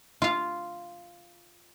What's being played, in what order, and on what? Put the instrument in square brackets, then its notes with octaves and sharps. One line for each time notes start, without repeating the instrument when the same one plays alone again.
[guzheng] F4 F5